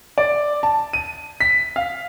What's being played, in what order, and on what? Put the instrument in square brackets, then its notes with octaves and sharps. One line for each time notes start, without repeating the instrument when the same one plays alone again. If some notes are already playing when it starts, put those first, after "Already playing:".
[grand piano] D5
A5
D#7
B6
F5